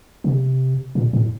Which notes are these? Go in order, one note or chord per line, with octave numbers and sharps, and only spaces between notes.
C3
A#2
A2